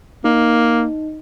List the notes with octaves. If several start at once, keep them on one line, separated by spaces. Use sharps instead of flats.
A#3 D#4